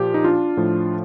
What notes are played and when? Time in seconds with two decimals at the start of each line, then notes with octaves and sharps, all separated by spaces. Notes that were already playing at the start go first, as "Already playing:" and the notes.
Already playing: A#2 F3 G4
0.14 D#4
0.24 D4 F4
0.57 A2 F3